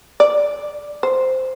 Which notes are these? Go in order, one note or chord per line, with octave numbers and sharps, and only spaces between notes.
D5
C5